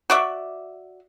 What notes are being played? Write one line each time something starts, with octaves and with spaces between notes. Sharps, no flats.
F#4 D5 E5